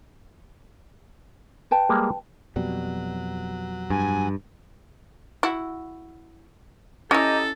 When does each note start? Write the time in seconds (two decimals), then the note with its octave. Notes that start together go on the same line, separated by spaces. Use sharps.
1.71 B4 G5 A5
1.89 G3 G#3 A#3
2.56 F2 B2 F#3 G3
3.90 G2 G#5
5.43 E4 F#4
7.11 C#4 E4 G4 A4 D#5 A#5